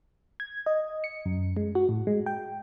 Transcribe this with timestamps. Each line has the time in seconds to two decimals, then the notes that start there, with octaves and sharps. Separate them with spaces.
0.40 G#6
0.66 D#5
1.04 C#7
1.26 F#2
1.57 G#3
1.75 F#4
1.89 A2
2.07 G#3
2.26 G5